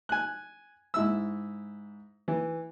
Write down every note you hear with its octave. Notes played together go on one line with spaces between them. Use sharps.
G#5 F#6
G#2 E4 E6
E3